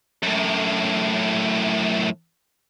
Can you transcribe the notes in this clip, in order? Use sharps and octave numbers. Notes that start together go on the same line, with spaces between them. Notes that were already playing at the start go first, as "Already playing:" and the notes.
F#2 A2